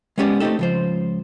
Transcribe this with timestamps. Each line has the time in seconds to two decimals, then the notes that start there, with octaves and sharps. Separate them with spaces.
0.18 G#3 B3 C#4 G4 C#5 D5
0.40 A3 C4 C#4 D#4 G4 A4
0.59 C#2 F3 C5